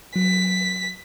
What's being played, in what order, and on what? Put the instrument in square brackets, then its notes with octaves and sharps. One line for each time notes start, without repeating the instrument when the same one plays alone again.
[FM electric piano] F#3 [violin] B6